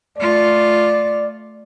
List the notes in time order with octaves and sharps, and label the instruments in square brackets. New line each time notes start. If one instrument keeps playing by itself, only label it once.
[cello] A3 F4 [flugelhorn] D5